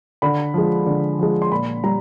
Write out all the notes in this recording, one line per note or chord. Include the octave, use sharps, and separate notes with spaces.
D3 B5
F3 G#3
D3
F3 G#3
C6
A#2 B5
G3 A#5